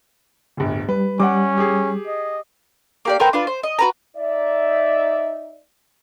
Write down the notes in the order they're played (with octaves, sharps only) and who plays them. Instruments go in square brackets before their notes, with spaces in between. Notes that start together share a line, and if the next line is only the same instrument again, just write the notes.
[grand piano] D1 G1
[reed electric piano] G3 [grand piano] B4
[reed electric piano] G3 [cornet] C#4 [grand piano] F#5 D6
[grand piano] G4 G#4
[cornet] D#5
[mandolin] A#3 G4 D5
C4 A#4 B4 G5
D4 F4 B4
C5
D#5
F#4 B4 A#5
[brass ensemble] D#4 D5 E5